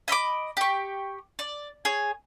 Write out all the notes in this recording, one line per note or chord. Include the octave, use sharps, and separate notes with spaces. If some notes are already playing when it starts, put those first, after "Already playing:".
D#5 E5 B5 D6
G4 C#6
D5
G#4 C#5